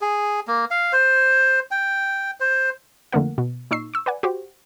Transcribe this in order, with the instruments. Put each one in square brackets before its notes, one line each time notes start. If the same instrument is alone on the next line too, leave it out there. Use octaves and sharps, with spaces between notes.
[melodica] G#4
A#3
F5
C5
G5
C5
[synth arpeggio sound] F2 D3 A3 A#3 A#4 F#5
B2
A#2 D#4 C#6 E6 C7
C#6 E6
B4 D5 F#5 G#5
F#4 G4 C5